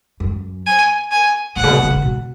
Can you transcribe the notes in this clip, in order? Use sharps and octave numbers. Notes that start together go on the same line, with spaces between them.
F#2
G#5
G#5
A2 F#5
C#3
B2
D3
C#3
B2